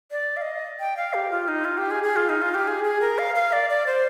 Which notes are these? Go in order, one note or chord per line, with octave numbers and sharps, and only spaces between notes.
D5
F5
D#5
G5
F5
G4
F4
D#4
F4
G4
G#4
G#4
F4
D#4
F4
G4
G#4
G#4
A#4
F5
F5
D5
D5
C5